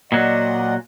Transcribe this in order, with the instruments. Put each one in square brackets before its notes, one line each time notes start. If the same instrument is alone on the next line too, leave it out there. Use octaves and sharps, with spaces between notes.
[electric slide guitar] A#2 F#3 [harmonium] D5 D#5 F#5